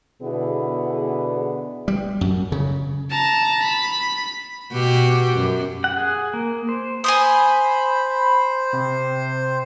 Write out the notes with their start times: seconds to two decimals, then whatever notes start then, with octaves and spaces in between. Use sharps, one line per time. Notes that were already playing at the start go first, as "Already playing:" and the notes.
0.22 B2 D3 B3 E4 G#4
1.88 G3
2.21 F#2
2.52 C#3
3.11 A5 A#5
3.62 B5
4.72 B2 F#4 G4
5.34 F#2
5.84 F#5
5.97 G#4
6.34 A#3
6.69 C5
7.04 C5 G#5 B5 C6 D#6
8.73 C3